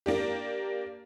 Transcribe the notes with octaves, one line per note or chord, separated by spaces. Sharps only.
A#3 D4 G4